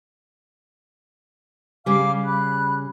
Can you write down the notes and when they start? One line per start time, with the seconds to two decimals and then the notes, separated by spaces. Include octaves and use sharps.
1.86 C#3 G3 F5 D6 F6
2.25 B5 F#6